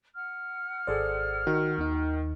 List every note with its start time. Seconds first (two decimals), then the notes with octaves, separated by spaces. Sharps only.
0.15 F#5 F6
0.87 G#1 G#4 A4 C5 D5
1.47 D#3 F#4
1.78 D#2 D#4